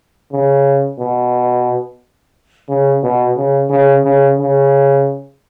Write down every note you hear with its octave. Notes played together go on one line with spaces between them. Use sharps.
C#3
B2
C#3
B2
C#3
C#3
C#3
C#3